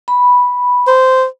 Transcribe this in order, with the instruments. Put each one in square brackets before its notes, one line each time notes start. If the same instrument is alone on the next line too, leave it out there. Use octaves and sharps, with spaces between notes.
[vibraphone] B5
[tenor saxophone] C5